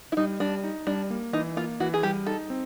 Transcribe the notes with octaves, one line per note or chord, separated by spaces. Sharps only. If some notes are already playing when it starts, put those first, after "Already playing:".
E4
G3 D#4
G3 D4
D#4
G3 D4
A#3
E3 D#4
A#3 F4
E3 F#4
G#4
G3 G4
D#4 A4
C4